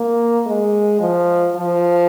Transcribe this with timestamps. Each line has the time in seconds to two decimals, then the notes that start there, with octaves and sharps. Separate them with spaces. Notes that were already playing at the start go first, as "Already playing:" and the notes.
Already playing: A#3
0.46 G#3
1.00 F3
1.56 F3